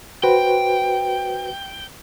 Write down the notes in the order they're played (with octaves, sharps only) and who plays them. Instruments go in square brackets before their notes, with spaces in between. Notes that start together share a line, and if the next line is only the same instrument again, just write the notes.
[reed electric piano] F#4 B4 C5 [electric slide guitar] G5